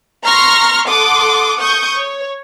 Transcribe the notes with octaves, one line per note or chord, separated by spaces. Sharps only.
A#5 C6 C#6 F6 A#6 C7
A4 F#5 C6 D6 D#6
C#6 D#6 G6
C#5